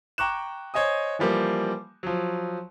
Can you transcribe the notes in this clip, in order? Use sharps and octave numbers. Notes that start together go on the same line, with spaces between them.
G5 A#5 C#6 D6 F#6 E7
C5 C#5 D#5 G#5 D#6
E3 F3 G3 A#3
F3 F#3